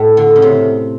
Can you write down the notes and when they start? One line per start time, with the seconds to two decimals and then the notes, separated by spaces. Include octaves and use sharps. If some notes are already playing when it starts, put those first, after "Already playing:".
Already playing: A2
0.17 D3
0.36 C#3
0.42 C3